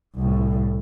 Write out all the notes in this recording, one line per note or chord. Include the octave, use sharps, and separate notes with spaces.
C2 A2